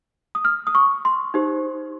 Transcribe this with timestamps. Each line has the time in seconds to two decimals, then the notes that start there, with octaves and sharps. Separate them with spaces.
0.35 D#6
0.45 F6
0.67 D#6
0.75 C#6
1.05 C6
1.34 D#4 G4 C5